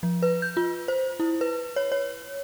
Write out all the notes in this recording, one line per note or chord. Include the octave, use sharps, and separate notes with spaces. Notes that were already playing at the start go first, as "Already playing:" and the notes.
F3
B4
G6
F4
C5
E4
B4
C#5
C#5